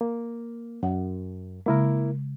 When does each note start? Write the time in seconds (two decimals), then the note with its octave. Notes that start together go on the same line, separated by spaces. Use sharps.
0.01 A#3
0.83 F#2 F#5
1.66 C#3 G#3 A#3 E4 A#4